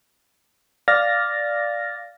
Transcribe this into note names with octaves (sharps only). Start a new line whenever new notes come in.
D5 F5 F6 A6 A#6